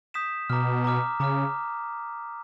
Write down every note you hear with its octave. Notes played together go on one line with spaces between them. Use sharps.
D#6 G6 B6 E7
B2 A#5 D6 F6
A#5 D6 F6
C#3 A#5 D6 F6